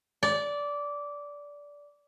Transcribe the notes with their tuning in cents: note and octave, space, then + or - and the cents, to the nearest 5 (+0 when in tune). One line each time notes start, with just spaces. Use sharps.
D5 -15